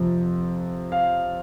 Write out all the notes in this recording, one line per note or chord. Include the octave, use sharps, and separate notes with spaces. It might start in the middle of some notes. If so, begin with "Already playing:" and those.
Already playing: F2 C3 F3 C4
F5